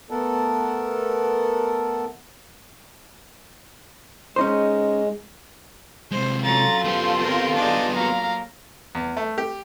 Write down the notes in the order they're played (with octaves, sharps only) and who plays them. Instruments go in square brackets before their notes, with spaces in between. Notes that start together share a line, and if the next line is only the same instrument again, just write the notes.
[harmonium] A3 B3 A4 A#4 F#5 A5
[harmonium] G#3 [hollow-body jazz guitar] C#4 D#4 C5
[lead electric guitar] C3 G#3 [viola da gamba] C5
[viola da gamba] F#3 C#4 [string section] F4 A4 [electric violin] A#5 A6
[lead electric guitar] B3 G4 [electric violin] C5 C6
[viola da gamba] C4 A#4
D4 D#4 G#4
[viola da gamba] F#3 A#3 [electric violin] F5 A#5
[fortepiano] E2
A3
G4